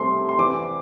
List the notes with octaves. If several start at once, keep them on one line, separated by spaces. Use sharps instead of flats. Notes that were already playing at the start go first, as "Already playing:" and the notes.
Already playing: C2 C3 A3 C4 C6
C6
E2 E3 C4 D6